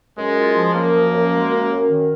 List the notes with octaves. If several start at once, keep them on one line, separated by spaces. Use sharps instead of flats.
F#2 G#3
F4
F3
F#2 A#3
F3
F#2
G#3
F#2
F#2
D#3